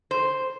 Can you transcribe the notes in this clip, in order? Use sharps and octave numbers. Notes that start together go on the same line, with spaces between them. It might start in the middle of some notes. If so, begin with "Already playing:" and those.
C5